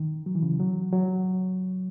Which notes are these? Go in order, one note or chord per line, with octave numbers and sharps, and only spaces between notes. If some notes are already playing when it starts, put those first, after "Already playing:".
Already playing: D#3
F#3
E3
C#3
F#3
F#3